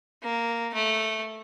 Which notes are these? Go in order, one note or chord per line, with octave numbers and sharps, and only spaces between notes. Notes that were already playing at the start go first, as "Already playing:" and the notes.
A#3
A3